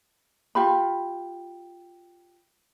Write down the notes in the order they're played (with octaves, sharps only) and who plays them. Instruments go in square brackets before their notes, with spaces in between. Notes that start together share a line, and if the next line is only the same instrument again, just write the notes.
[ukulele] F4 G4 B5